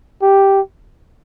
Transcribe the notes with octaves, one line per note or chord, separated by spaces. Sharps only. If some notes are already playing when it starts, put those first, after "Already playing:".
G4